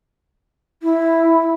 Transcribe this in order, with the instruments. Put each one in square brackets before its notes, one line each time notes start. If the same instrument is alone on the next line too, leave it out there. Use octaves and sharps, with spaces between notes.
[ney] E4